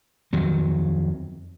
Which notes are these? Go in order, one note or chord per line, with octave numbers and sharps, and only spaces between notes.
F2 D#3 F#3